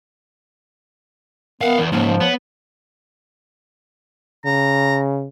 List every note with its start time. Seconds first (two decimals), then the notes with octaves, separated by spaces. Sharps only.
1.61 B3 A#4 F5 F#5
1.78 E2
1.92 C#2 G#2 F3 A#3
2.05 F3
2.20 B3 C#5
4.45 C#3 A#5